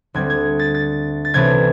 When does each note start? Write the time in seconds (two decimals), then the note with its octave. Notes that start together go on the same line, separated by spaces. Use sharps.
0.14 D2 D3 G3 C4 G#6
0.30 G#6
0.59 A6
0.74 A6
1.25 A6
1.34 C2 C3 E3 A3 C#4 G#6